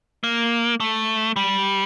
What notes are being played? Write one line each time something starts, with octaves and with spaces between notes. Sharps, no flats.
A#3
A3
G3